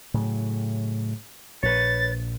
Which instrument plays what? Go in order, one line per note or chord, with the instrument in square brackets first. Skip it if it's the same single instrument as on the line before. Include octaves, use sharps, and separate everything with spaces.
[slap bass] A2 C#3 F#3
[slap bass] A#1 [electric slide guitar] B4 C#5 [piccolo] A6